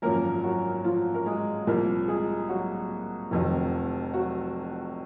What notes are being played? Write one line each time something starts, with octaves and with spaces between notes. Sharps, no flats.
G#1 F#2 F3 A#3 A#4
F#3 F#4
F3 F4
A#4
G#3 G#4
C2 A#2 F3 A#3 A#4
G#3 G#4
F#3 F#4
F1 F2 D#3 F#3
F#3 F#4